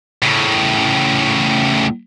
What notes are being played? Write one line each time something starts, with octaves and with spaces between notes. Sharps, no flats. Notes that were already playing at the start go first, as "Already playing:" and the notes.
A2 C#3